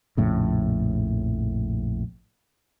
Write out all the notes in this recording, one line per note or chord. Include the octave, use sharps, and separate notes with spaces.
A#1 F2 A2 C#3